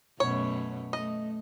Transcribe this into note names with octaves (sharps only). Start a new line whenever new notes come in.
F#2 B2 A3 C#5
A3 D#5